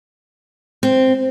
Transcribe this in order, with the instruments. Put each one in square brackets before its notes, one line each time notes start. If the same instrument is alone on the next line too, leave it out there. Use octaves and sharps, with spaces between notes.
[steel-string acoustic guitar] C4